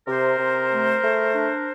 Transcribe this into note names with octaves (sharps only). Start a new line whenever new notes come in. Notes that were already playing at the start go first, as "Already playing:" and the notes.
C3 A#4 C5
C3
A3
A3
D4